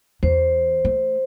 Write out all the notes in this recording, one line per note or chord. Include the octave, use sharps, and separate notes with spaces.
E2 C5
A3